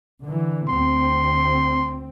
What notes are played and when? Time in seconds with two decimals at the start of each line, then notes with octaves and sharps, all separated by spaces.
0.22 D3 E3
0.69 D2 C4 C6